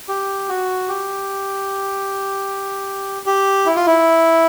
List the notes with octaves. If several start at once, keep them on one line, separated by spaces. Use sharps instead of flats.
G4
F#4
G4
G4
E4
F4
E4